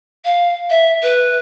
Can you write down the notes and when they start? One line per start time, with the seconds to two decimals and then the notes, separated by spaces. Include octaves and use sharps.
0.25 F5
0.70 E5
1.02 B4